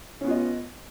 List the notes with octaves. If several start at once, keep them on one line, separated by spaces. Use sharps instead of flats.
B3 C#4 F4 D#5